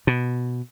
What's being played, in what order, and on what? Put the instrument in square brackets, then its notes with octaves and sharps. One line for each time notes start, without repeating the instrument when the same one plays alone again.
[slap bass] B2